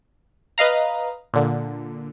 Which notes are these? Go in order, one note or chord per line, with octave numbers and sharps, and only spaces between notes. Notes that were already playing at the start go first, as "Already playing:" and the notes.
B4 D#5 F5 A#5
A#2 D3